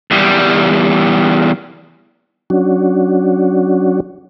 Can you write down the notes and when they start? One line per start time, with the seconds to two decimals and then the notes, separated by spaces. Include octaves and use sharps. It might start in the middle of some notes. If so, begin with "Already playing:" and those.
0.11 E2 G3
2.50 F#3 C#4 D4 F#4